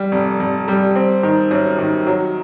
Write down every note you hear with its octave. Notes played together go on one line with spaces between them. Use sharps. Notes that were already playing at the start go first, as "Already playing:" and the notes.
Already playing: G3
F1
F1
G3
C4
D#3
F#2
D#3
F#3